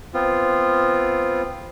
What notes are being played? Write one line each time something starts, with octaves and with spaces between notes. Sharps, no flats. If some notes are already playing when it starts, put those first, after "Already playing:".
B3 C4 F4